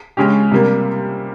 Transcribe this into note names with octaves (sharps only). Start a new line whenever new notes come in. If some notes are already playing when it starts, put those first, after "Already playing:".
C#3 G#3 C#4 G4
C3 G3 A#3